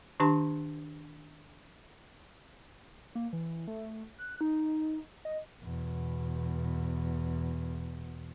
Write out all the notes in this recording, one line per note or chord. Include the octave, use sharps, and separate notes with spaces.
D#3 D4 G4 A5 A#5 C6
A#3
E3
A3
F#6
D#4
D#5
E2 B2